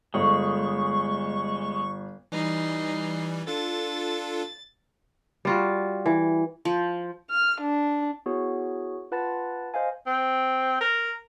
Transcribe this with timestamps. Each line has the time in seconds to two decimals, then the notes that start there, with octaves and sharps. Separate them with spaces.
0.14 G1 G#3 C#6
2.32 E3 G3 D#4 C7
3.47 D4 F4 A4 A6
5.45 G3 F4 F#4
6.06 E3
6.65 F3
7.30 F6
7.61 D4
8.26 B3 E4 F#4 G#4 A#4 C#5
9.12 F4 B4 F#5 A5 B5 A6
9.74 C5 D#5 F5 G#5
10.07 C4
10.81 A#4